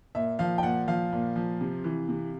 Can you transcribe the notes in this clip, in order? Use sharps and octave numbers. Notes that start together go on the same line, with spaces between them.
A#2 E5
F3 F5
G5
A#2 F#5
F3 F5
A#2
F3
C3
E3
C3